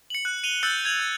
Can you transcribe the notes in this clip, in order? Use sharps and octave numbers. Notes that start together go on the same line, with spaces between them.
C#7 F#7
F#6
D#7 F7 G7
E6 F#6 G6 A6 C#7 F#7
G#6 F7 F#7
F#6